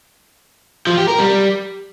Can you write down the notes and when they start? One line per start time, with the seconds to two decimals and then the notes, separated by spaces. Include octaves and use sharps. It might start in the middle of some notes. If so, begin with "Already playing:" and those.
0.87 F3
0.97 G4
1.08 A#4
1.19 G3